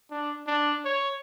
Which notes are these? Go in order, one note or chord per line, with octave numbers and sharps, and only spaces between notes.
D4
D4
C#5